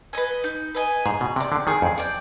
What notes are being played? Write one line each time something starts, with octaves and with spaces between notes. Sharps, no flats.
B4 D#5 G#5
D#4
B4 D#5 G#5
G#2 G#4
B2
C3 D5 G5
D3
D#3 G#4
F2
D5 G5